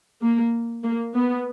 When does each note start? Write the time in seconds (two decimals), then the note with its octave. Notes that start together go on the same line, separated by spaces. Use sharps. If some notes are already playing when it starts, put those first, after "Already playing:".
0.20 A#3
0.83 A#3
1.15 B3